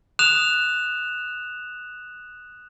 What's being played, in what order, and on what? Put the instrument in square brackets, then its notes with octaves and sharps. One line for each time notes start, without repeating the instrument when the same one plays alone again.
[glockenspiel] D#6 F#6 E7 F7